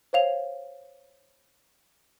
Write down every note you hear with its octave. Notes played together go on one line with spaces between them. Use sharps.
C5 C#5 F5 F7